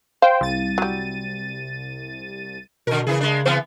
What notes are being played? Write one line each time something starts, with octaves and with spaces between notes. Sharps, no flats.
C5 F5 G5
C2 A6 D#7
F#3 G3
B2 D3 A#4
C#3 E3 E4 G#4
G#3 D4
E3 B3 C4